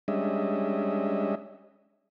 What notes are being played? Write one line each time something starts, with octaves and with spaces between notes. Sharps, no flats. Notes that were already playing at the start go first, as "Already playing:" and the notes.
G3 G#3 C#4 D4 D#5 E5